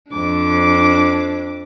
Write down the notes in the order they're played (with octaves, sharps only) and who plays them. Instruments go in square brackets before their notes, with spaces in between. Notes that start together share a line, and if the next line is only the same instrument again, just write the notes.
[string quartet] F2 D6 [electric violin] D4